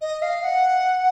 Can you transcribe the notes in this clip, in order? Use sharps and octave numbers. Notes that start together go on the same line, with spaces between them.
D#5
F5
F#5